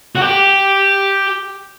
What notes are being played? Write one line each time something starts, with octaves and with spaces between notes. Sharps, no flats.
F#4
G4